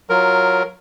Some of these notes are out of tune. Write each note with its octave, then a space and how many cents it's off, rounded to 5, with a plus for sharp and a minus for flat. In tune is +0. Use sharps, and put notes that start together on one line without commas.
F#3 -5 F4 +0 A#4 +0